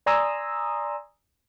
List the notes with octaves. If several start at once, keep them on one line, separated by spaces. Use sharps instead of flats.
D5 G#5 A#5 C6 D#6 E6